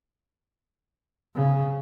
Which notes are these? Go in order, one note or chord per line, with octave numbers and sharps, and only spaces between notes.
C#3